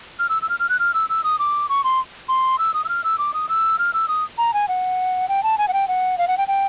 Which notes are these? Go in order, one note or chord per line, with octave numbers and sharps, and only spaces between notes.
F6
E6
E6
F6
F6
F#6
F6
E6
E6
D#6
D6
C#6
C6
C6
E6
D#6
E6
F6
E6
D6
D#6
E6
F6
E6
D#6
A#5
G#5
F#5
G5
A5
G#5
F#5
G5
F#5
F5
F#5
G5
G5